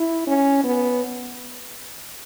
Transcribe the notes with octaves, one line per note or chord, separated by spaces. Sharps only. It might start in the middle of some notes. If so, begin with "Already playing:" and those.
Already playing: E4
C#4
B3